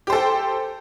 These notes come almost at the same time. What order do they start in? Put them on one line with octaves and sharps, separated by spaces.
G4 C5 A4 G5